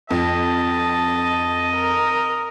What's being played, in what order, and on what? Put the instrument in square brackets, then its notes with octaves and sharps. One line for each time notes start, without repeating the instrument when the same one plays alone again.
[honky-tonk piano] F2 [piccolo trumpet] D#5 [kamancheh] A5
[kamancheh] A#4